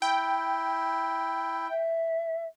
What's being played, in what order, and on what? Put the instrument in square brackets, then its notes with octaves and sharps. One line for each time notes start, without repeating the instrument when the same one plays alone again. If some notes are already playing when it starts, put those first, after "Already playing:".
[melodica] E4 [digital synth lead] G5
[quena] E5